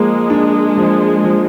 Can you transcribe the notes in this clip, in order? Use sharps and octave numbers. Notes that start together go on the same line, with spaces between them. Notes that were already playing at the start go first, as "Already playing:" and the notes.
Already playing: F3 G#3 A#3
D4
F3
F3